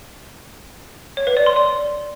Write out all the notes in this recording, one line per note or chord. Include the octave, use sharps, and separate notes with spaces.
C#5
B4
D5
C6
D5